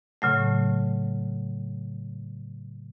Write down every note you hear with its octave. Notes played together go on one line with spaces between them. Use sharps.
A2 C#3 F#3 A3